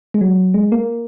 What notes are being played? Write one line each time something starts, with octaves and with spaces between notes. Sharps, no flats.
G#3
F#3
G#3
A#3